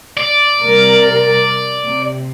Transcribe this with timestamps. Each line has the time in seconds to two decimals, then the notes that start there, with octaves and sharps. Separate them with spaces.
0.17 D5
0.61 C3 G3 A#4
1.83 C3